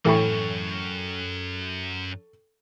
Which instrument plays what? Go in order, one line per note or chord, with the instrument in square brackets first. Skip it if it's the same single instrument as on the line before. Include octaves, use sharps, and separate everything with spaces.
[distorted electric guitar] F#2 [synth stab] A2 E3 [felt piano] A4 G5 C#6